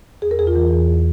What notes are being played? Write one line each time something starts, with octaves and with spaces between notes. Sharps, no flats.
E2 G#4
A#4
E2 G#4
F4
E3
E2